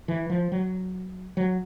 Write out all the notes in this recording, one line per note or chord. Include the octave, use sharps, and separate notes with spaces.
E3
F3
F#3
F#3